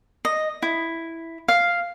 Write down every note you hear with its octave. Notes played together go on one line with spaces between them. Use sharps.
D#5
E4
F5